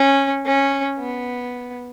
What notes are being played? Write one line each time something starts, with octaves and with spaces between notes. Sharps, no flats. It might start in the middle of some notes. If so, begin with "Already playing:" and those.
Already playing: C#4
C#4
B3